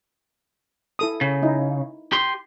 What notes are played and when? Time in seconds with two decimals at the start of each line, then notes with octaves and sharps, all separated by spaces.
0.99 E4 A4 D#6
1.21 C#3
1.43 D#4 E4
2.12 G4 C6